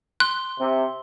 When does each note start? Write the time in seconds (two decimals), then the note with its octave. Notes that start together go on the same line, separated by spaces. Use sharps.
0.20 C6 F#6 G7
0.59 C3